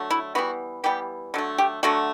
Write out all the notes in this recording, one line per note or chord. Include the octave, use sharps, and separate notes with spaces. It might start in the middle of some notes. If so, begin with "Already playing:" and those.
Already playing: D3 F#3 A3
E4
E3 G3 B3 F#4
E3 G3 B3 G4
D3 F#3 A3
G4
D3 F#3 A3 F#4